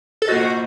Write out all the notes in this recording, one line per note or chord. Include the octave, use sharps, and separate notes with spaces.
A4
A#3 F4 F#4 C5 D#5